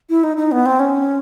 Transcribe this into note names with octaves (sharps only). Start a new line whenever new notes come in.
E4
D#4
D#4
B3
C4
C#4